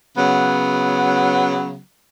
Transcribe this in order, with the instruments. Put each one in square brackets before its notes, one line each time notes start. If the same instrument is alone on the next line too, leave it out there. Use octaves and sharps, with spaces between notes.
[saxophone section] C#3 F#3 B3